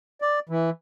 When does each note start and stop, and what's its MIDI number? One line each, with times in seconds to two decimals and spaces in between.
0.22 0.39 74
0.49 0.70 52